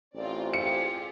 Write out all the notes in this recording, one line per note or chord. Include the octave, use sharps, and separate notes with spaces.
A1 C4 F4 A#4 D5
F4 G4 G#4 C#7